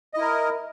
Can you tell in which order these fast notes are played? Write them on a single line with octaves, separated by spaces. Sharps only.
D#5 E4 A#4